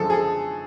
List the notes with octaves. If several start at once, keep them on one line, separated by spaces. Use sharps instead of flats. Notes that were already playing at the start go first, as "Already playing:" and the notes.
Already playing: F#2 D3 F3 G#3 A4
G#4
A4